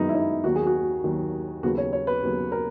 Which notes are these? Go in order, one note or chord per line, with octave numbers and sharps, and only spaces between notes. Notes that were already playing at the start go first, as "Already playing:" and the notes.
Already playing: F#2 D#3 G#3 B3 D#4
E4
D#4
D#2 D#3 F#3 A#3 F#4
G#4
F#4
D#2 D#3 F#3 A#3
D#2 C#3 F#3 B3 F#4
C#5
C#5
B4
D#2 C#3 F#3 B3
A#4